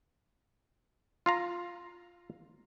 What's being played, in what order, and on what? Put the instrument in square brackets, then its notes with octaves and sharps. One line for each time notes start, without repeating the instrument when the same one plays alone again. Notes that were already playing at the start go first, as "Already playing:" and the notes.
[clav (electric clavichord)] F4 F5 A#5